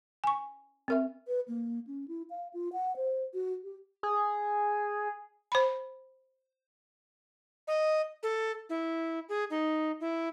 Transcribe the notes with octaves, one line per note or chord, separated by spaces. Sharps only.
G#5 C#6
C4 A#4 E5
B4
A#3
C#4
E4
F5
F4
F#5
C5
F#4
G4
G#4
C5 B5
D#5
A4
E4
G#4
D#4
E4